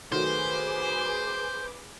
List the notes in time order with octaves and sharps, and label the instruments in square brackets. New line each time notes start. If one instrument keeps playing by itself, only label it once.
[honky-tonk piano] D#3 F#3 A3 [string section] G#4 B4 D6 [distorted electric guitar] C5